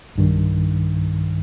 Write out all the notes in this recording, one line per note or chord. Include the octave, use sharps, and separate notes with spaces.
B1 G2 D#3